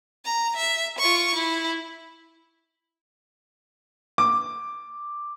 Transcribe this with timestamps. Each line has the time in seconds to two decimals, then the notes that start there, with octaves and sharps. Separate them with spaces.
0.25 A#5
0.56 E5
0.98 F4 C#6
1.35 E4
4.18 D6